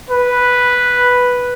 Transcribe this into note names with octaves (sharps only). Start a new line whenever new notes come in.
B4